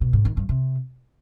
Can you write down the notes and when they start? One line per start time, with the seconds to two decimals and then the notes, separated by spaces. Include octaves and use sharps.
0.01 B2
0.13 G#2
0.25 D#3
0.37 G2
0.49 C3